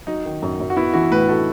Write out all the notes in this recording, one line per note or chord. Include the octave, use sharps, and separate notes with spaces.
F#3 D#4
D#3
F#2
F#2
F#4
B3 E4
E3 F#4
A2 B4
F#4 A4